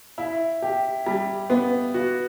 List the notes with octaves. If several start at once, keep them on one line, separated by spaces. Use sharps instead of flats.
E4
G4
G3
B3
F#4